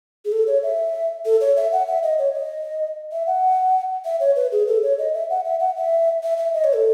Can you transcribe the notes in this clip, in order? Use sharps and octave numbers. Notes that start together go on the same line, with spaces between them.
G#4
A4
C#5
E5
A4
C#5
E5
F#5
E5
D#5
C#5
D#5
E5
F#5
E5
C#5
B4
G#4
A4
C#5
D#5
E5
F#5
E5
F#5
E5
E5
E5
D#5
C#5
A4